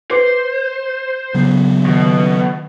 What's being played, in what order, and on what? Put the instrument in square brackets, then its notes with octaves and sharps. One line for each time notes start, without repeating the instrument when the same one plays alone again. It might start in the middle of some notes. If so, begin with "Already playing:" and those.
[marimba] B4 D6 [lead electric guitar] C5
[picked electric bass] C#3 F#3 B3
[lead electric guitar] B2 [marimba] D#3